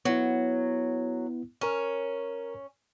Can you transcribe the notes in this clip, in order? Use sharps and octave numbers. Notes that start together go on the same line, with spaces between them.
F#3 B3 E4
C#4 A#4 C#5